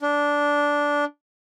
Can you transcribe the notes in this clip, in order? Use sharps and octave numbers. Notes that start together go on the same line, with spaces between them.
D4